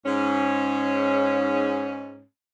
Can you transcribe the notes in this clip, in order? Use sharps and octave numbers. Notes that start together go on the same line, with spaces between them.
G#2 C#4